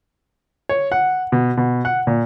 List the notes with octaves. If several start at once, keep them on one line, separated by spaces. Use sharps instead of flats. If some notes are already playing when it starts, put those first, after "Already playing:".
C#5
F#5
B2
B2
F#5
A#2